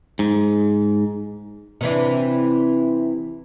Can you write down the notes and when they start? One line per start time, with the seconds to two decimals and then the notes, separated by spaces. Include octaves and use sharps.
0.19 G#2
1.81 C3 E3 D4